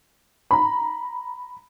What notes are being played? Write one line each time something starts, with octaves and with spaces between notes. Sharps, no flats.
A#5 B5